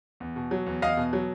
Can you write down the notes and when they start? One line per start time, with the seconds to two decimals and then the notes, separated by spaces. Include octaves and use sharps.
0.20 E2
0.36 B2
0.51 F#3
0.66 E2
0.82 E2 D#5 F5
0.97 B2
1.13 F#3